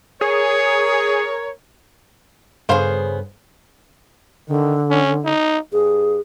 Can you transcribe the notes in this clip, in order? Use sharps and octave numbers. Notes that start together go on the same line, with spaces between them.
G#4 A#4 C#5
G2 C#3 B3 G#4 C5 F5
D3 D#3
C#4
D#4
G2 G#4